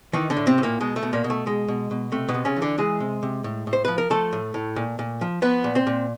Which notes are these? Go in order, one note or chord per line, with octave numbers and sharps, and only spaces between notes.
D#3 E3 D#4
D3 D4
A2
C3 C4
A2
A#2 A#3
B2 G#3
A3
B2
A#2 A#3
B2
A3
B2 G#3
B2
B2
C3 A3
B2 B3
C3
C#3 C#4
E3
D3 D4
E3 G#3 G#4
C3
C3
A2
A2
C5
F3 B4
A#4
F3 A3 A4
A2
A2
A#2
A#2
F3
F3 B3 B4
A#2
C4 C5
A#2